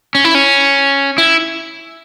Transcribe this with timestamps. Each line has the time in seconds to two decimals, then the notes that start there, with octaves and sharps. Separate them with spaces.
0.15 C#4
0.25 E4
0.35 C#4
1.18 E4